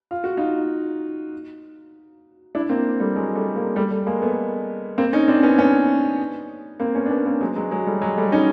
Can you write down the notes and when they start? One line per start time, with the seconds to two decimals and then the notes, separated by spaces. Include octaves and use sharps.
0.11 F4
0.24 F#4
0.37 D#4 F4
2.55 D4 E4
2.69 A#3 C4
3.00 G3 A3
3.16 F#3 G#3
3.35 G3 A3
3.56 G#3 A#3
3.76 G3 A3
3.91 G3 A3
4.06 G#3 A#3
4.21 A3 B3
4.98 A#3 C4
5.13 C#4 D#4
5.28 C4 D4
5.43 B3 C#4
5.58 B3 C#4
6.80 A#3 C4
6.95 B3 C#4
7.06 D4
7.10 B3 C#4
7.26 A#3 C4
7.41 F#3 G#3
7.56 F#3 G#3
7.71 F#3 G#3
7.87 G3 A3
8.01 F#3 G#3
8.17 G3 A3
8.32 C#4 D#4